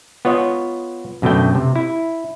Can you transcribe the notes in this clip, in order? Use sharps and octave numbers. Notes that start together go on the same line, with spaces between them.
B3 F4 C#5 D#5
F#2 B2 D3 A3 G5
C3
E4